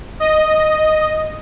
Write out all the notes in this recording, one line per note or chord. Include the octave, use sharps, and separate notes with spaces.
D#5